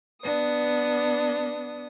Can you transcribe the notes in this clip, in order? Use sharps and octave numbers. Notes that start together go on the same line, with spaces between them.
B3 D4 D#6